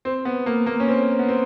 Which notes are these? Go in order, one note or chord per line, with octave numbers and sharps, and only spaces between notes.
C4
B3
A#3
A#3
C#4
C4
B3
C4